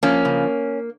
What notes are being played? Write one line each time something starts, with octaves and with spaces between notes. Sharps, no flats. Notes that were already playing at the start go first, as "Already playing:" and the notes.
F3 A#3 C#4
C#3